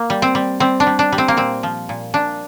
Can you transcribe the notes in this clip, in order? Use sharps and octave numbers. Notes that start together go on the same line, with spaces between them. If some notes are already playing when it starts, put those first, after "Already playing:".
Already playing: A#3
G3
C4
G3
G3 C4
D4
G3
D4
G3
C4
A#3
A#2 C4
F3
A#2
A#2 D4